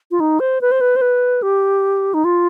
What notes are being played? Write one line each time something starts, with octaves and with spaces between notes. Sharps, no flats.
F4
D#4
C5
B4
C5
B4
C5
B4
G4
D#4
F4